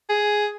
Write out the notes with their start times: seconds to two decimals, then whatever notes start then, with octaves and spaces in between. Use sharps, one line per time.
0.09 G#4